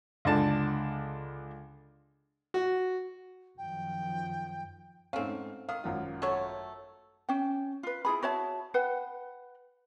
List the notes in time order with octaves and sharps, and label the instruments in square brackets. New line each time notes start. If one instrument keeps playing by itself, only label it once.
[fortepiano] C#2 D3 D4 A5
F#4
[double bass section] F#2 D#3 F3 [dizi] G5
[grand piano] G#2 A3 F5 [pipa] C4 C#4
[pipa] D#3 [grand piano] F5 D#6
[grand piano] G#1 F#2 F4
[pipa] F#3 A3 C#5
[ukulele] C#4 G5
F4 B4
E4 F4 G#4 B5
F#4 C#5 E5 A5
B4 F#5 G5